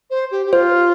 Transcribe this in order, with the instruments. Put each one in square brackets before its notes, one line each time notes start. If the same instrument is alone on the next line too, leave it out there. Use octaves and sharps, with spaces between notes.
[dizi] C5
G4
G4
[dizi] F4 [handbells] C5